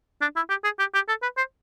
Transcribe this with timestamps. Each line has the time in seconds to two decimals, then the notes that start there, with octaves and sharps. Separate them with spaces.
0.21 D4
0.36 E4
0.49 G4
0.64 G#4
0.79 G4
0.94 G4
1.08 A4
1.22 B4
1.37 C5